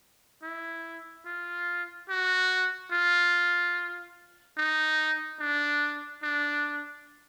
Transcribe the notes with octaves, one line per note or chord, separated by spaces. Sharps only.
E4
F4
F#4
F4
D#4
D4
D4